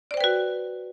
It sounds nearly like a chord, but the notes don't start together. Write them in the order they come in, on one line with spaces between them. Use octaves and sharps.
D5 C5 G5 B4 F#4